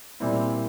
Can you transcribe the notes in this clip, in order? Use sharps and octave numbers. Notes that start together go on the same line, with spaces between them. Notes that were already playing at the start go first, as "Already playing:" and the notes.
A#2 G3 C4 E4